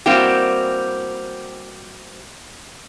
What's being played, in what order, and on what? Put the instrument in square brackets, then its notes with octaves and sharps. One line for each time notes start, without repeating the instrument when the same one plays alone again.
[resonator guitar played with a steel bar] G3 A#3 C4 E4 F#4 G4